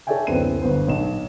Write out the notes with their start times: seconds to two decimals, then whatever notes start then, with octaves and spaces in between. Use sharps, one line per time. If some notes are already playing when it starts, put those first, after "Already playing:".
0.07 A4 C#5 D5 E5 G5 G#5
0.27 D1 F#2 B3 C4 D#7
0.62 G1 B3 C5
0.88 B1 E7